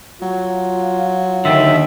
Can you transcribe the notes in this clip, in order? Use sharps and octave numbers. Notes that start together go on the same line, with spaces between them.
F#3 F4
D#2 D3 D#3 E5